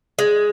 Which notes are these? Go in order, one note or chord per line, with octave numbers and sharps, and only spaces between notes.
G#3